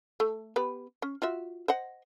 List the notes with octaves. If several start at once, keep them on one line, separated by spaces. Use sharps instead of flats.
A3
B3 G4 B4
C#4
F4 F#4 E5
C5 D#5 F#5